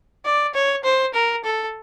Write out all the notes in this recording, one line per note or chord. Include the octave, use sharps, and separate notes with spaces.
D5
C#5
C5
A#4
A4